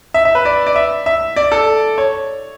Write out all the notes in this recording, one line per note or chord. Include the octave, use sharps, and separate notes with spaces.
E5
E5
B4
D5
D5
E5
E5
D5
A4
C#5